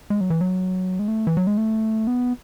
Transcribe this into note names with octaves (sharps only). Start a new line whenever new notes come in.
G#3
F#3
E3
F#3
G#3
A3
E3
F#3
G#3
A3
B3